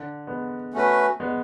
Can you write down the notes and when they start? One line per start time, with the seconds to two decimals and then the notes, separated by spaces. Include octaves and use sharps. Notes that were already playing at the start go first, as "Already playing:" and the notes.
Already playing: D3
0.27 G#3 B3
0.74 A3 C#4 F#4 B4
1.20 G#3 B3